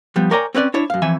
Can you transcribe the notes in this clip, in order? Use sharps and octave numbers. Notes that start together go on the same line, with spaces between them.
F3 G3 B3
A#4 C#5 D5 G5 G#5 A#5
C4 C#4 B4 D5
D4 E4 C#5
F#2 F5
F2 E3 E5 G#5